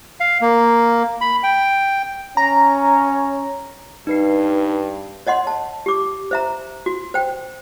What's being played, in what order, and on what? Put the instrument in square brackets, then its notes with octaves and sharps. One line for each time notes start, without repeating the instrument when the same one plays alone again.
[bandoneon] F5
A#3
B5
G5
[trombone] C#4 [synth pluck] A#5
[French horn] G2 [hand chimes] D#4 B4 C7
[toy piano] C#5 D#5 F#5 C6
A5
G4 D6
C5 E5 A#5
F#4
C5 G5